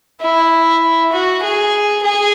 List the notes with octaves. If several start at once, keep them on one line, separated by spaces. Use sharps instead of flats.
E4
F#4
G#4
G#4